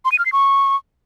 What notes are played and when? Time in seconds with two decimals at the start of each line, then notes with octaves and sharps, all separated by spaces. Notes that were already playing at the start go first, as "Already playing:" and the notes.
0.05 C6
0.12 D#7
0.19 F6
0.26 C7
0.32 C#6